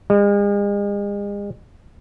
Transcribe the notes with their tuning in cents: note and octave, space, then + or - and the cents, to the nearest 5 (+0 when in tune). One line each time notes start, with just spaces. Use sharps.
G#3 -40